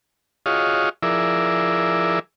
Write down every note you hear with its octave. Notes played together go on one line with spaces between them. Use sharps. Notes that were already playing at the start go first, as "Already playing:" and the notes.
F4 F#4 G#4 C#5 D#5 F5
F3 E4 G#4 A#4 D5 E5